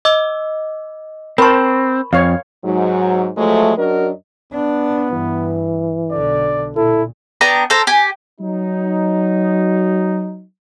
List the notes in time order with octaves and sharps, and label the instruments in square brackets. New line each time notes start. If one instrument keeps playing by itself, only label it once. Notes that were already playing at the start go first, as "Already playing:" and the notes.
[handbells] D#5 D6 E6
[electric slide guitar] C4 [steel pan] A#4 C5 A5 [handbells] B5 C#6
[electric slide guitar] F2 [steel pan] C#5 F5
[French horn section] G#2 F#3
F3 F#3 G#3 A3
F#2 F#3 D4 F#4 A#4 D#5
[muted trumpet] B3 [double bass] D4
[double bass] G2 [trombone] E3
[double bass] B1 D3 [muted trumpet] D5
[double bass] A#2 [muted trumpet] E4 [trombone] A4
[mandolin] B3 D4 G5 A#5
A4 C5 G5 A#5
G4 G#5
[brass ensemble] F#3 D#4